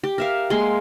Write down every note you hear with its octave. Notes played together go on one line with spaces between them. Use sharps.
G4
A#4 E5 F5
G#3 A#3 G#4 C6